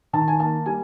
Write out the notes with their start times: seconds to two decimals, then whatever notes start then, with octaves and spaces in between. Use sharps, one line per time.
0.13 D#3 A5
0.28 G#5
0.40 A#3 A5
0.66 G3 G#5